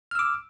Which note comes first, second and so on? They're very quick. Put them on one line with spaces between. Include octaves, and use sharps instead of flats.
F6 E6 D6